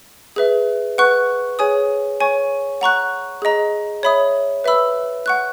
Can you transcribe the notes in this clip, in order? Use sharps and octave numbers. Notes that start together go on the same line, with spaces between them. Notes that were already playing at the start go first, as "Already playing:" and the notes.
G#4 B4 E5
B4 F#5 C#6 F#6
G#4 C#5 G#5 D#6
C#5 G#5 C#6
F#5 A#5 C#6 F#6
G#4 D#5 A#5
C#5 E5 B5 D#6
B4 E5 B5 E6
F#5 C#6 F#6